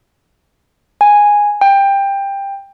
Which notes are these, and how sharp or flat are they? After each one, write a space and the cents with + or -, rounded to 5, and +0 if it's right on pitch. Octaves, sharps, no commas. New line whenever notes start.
G#5 -5
G5 +15